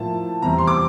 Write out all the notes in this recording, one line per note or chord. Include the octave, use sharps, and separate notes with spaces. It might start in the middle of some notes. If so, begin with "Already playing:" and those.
Already playing: A2 F3 A#3 A5
E2 C3 G3 C4 A#5
C6
D6